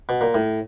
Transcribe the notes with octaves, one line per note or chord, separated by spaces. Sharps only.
B2
A#2
A2